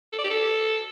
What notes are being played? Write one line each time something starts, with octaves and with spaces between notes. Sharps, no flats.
A4
D5
G4
A4